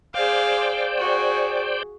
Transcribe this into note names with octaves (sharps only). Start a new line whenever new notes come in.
G#4 C5 D5 F5 G5
F#4 G#4